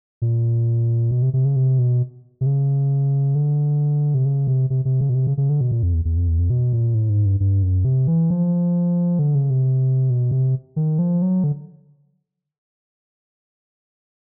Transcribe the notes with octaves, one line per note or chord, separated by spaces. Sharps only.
A#2
B2
C3
C3
C#3
C3
B2
C3
C#3
D3
C3
C#3
C3
C3
C3
C#3
B2
C3
C#3
C#3
D3
B2
A#2
F2
E2
E2
F2
E2
F2
B2
A#2
A2
G#2
G2
G2
F#2
C3
E3
F3
D3
C#3
C3
B2
C3
D#3
F3
F#3
D3